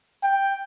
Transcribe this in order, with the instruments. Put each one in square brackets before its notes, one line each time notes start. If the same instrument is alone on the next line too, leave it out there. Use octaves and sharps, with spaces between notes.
[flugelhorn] G5